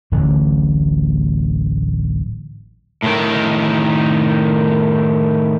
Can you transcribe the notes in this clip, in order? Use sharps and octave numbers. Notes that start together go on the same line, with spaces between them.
D1 A1 D3
A2 D#3